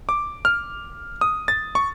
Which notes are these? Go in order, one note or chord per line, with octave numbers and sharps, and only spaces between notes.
D6
F6
D#6
A6
C#6